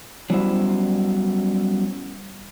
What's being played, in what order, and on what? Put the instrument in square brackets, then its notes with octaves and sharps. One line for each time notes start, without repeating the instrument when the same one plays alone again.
[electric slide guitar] F#3 G3 B3 C#4 E4 C5